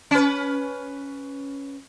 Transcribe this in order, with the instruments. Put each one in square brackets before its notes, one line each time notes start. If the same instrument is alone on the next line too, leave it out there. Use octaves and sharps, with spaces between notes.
[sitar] C#4 B4